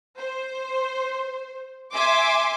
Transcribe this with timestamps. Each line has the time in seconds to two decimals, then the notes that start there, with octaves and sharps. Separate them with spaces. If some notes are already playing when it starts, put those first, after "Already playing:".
0.18 C5
1.94 E5 G#5 C6 D6